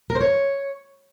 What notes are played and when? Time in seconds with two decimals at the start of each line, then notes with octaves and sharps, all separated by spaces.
0.10 A#4
0.15 C5
0.21 C#5